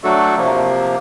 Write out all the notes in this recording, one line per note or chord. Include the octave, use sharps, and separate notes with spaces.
F#3 A3 D4 F#4 A4
C3 F3 A#3